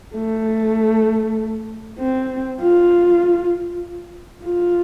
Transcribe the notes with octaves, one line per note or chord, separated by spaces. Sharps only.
A3
C4
F4
F4